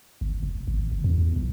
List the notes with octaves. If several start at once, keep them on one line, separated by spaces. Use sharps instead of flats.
G1
F1
G#1
F#1
E2
B1